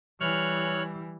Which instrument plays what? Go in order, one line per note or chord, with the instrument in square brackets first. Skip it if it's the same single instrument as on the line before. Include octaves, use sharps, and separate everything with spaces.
[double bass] E3 G3 [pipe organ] C#5 F6 F#6